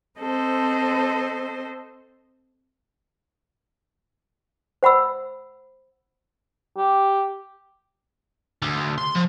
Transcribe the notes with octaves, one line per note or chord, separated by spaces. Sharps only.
C4 A4 C5 D#5
C5 F#5 B5 E6
G4
D2
C6
F3